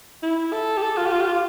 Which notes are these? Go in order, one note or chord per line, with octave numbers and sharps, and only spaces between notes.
E4
A4
G4
A4
F4
G4
F4
G4
F4